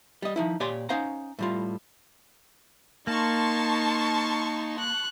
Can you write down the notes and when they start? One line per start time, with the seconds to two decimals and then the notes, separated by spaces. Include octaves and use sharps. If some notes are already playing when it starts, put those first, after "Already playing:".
0.22 G3 D#5
0.36 F3 D#4 E4
0.60 A#2 G4 C#5 D5 G#5 C6
0.89 C#4 D#4 C5 F5 F#5 A#5
1.39 A2 G3 F4
3.07 A#3 D#4 A5 C6 C#6
4.79 F#6